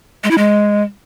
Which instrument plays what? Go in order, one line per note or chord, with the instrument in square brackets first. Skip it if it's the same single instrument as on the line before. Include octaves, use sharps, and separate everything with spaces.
[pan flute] G#3
E4
G#3